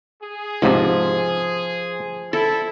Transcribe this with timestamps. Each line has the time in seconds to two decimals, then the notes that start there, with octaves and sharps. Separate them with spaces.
0.23 G#4
0.62 C#2 G#2 C3 F3
2.33 E4 A4